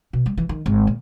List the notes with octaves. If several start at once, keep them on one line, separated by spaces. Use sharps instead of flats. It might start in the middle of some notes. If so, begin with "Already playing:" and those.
B2
G3
E3
D#3
G#1
A#2